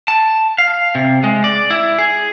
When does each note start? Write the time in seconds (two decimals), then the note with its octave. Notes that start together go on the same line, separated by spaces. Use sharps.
0.08 A5
0.58 F5
0.95 C3
1.24 G#3
1.44 D5
1.71 E4
1.99 G#4